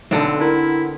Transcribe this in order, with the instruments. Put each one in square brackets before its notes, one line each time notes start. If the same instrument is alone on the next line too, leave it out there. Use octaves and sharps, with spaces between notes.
[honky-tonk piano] B1 A4 [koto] D3 B3 C4
[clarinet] E4 [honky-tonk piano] A#4